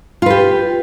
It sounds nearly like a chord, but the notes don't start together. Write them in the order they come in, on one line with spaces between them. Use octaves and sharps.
F4 B4 G4